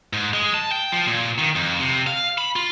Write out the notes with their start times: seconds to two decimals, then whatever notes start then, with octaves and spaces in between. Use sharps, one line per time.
0.13 G#2
0.33 G#3
0.54 A5
0.72 G5
0.92 F3
1.07 A#2
1.38 D#3
1.55 F2
1.80 C3
2.07 F5
2.38 B5
2.56 F4